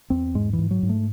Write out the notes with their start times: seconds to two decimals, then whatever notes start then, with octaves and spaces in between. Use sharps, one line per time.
0.10 E2 C4
0.35 G#2 G#3
0.53 E3
0.58 G#2
0.71 F#3
0.83 G#2
0.89 A3